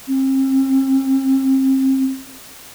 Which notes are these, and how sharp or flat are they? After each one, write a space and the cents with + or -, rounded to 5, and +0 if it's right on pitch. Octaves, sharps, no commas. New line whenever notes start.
C4 +35